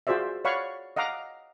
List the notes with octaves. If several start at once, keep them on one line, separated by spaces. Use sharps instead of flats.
F4 F#4 G#4 C5 D5 E5
C#5 D5 F5 F#5 B5 C#6
D#5 F5 F#5 A#5 D6